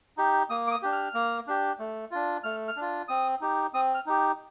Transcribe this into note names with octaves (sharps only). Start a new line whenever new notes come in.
D#4 G4
A#3 D#6
D6
D#6
D4 G4
F6
A#3
D4 G4
A3
D4 F4
A3 F6
F6
D4 F4
C4 D#6
D#4 G4
C4 D#6
F6
D#4 G4